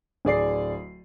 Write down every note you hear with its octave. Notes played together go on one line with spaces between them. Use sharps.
D1 G#4 D5 C7